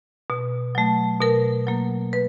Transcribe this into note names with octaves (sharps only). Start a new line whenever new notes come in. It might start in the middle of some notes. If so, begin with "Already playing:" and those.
B2
F#3 A3
B2 A#4
F#3 A#3
B4